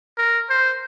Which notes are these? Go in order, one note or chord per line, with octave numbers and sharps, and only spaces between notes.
A#4
C5